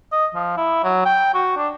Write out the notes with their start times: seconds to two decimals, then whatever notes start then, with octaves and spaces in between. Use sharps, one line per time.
0.12 D#5
0.35 F3
0.57 E4
0.84 F#3
1.06 G5
1.34 F#4
1.57 D4